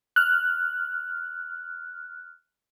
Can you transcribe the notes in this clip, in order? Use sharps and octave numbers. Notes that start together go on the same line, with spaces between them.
F6 F#6